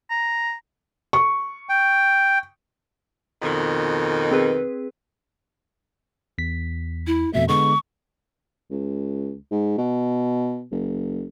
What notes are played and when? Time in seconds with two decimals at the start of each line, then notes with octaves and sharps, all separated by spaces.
0.10 A#5
1.13 C#6
1.69 G5
3.42 F2 B2 D#3
4.31 C4 G#4 B4
6.38 E2 B6
7.07 E4
7.33 F2 B2 A3 E5
7.49 D3 G#3 B3 C#6
8.70 C#2
9.51 G#2
9.78 B2
10.71 F#1